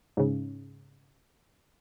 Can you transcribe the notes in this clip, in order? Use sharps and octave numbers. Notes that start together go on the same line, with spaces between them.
G#2 C#3